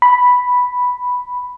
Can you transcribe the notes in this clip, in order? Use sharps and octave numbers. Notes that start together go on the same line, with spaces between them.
B5